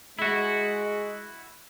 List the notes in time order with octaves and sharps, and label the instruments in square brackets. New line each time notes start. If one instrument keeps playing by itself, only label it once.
[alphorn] G#3 [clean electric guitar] E4 F#4